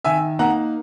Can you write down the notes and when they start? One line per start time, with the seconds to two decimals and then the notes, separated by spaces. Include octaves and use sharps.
0.05 D#3 E5 G#5
0.39 A#3 D#4 F#5 A#5